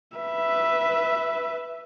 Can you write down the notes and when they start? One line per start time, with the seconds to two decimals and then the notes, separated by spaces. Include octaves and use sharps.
0.18 B4 E5